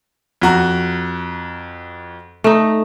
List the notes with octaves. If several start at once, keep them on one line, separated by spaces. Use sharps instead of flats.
F2 F#4 A#5
A3 D#4